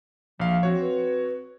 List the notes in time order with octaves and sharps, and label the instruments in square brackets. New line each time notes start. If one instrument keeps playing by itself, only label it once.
[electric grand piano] A#1 F5 [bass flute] F3
[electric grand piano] C4 F#4 C#5
[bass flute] B4